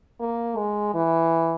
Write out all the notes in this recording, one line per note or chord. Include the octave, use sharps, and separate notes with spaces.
A#3
G#3
E3